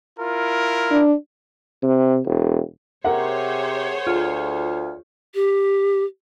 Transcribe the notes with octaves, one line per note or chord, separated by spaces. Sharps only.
E4 F4 A#4
D4
C3
E1
C3 G#4 A#4 C5 C#5 F#5
D2 F4
G4